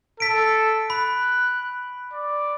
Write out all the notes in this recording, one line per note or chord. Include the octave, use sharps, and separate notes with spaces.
A4 B6 D7
B5 F#6
D5